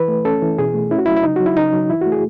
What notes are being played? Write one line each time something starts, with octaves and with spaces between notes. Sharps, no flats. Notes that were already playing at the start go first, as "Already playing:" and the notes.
Already playing: E3 B4
A3
C#4 A4
E3
B2 G#4
A3
C#4 E4
F#4
F#3 E4
E4
C#3 D#4
F#3 F#4
E4
C#3 D#4
F#3
E3 E4
A3 F#4
G#4